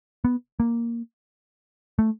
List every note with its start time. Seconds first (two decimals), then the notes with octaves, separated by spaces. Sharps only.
0.25 B3
0.60 A#3
1.99 A3